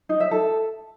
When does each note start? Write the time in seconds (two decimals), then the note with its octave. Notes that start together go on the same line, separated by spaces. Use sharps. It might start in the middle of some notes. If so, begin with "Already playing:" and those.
0.09 D#4
0.20 E5
0.31 A4